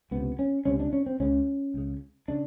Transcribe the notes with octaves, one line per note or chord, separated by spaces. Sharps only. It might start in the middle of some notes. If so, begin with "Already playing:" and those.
C#2 C3 B3
C#4
C#2 C3 C#4
D4
C#4
C4
C#2 C#3 C#4
C#2 C#3
C#3 D4